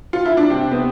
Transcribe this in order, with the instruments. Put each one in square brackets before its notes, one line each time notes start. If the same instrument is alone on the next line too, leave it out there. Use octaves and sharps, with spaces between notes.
[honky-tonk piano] F4
E4
D4
C3 C4
B3